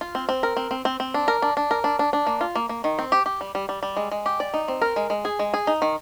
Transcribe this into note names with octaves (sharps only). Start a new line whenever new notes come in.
F4
C4
C4
A#4
C4
C4
C4
C4
D4
A#4
D4
D4
A#4
D4
D4
D4
A#3
F4
A#3
A#3
D#3
C4
G4
G4
G3
G3
G3
G3
G#3
G#3
G4
D5
D#4
C4
A#4
G#3
G#3
G#4
G#3
G#4
D#4
D#3